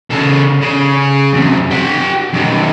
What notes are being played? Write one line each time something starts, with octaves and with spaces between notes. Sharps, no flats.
C#3 A4
C#3
F#2 C3
G4 F#5
F#2 D#3